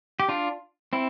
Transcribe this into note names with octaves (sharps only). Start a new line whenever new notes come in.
G4
D4 F4
C4 E4